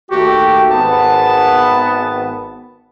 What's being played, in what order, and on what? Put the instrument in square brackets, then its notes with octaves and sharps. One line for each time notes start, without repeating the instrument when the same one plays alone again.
[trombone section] D#2 A3 G4 [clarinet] F#4
[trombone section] G#1 B3 [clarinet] A5